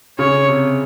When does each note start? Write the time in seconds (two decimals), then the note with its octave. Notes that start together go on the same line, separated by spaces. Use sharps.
0.19 C#3 C#5
0.48 C3